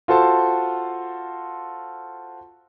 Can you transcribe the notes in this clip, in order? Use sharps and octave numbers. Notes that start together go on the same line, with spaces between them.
F4 F#4 A4 C5 A5